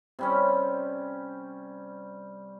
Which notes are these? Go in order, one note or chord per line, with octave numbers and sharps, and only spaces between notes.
C3 G3 C#4